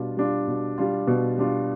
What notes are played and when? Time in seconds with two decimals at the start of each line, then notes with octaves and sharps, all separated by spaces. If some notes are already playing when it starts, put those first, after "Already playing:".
Already playing: B2 G3 D4 F4
0.17 G3 D4 F4
0.48 B2
0.78 G3 D4 F4
1.07 B2
1.38 G3 D4 F4